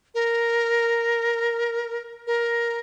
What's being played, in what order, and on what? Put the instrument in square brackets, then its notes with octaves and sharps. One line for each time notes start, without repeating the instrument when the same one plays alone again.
[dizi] A#4
A#4